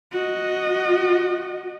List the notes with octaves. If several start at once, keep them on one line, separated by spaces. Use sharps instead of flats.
F#4 D#5